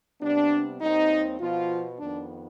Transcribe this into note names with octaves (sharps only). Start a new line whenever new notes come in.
C3 G3 B3 D4
D#2 D#3 G3 C4 D#4
B2 F3 B3 F4
F2 D#3 B3 D4